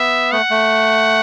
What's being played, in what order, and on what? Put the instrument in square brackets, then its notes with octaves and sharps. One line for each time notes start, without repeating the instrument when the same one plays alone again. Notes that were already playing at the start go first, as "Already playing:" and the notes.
Already playing: [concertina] B3 [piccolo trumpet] E5
[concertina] A3 [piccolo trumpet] F#5
[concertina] A3